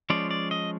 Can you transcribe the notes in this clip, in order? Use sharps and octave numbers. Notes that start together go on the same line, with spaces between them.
F3 G#3 C#4 D5
D5
D#5